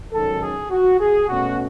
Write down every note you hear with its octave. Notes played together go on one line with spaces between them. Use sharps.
G#2 D#3 F#3 C#4 A4
G#4
F#4
G#4
B2 A3 C#4 F#4